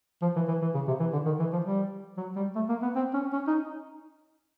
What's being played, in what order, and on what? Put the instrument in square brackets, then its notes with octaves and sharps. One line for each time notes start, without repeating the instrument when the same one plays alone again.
[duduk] F3
E3
E3
E3
C#3
C3
E3
D3
D#3
E3
F3
G3
F#3
G3
A3
A#3
B3
C4
C#4
C#4
D#4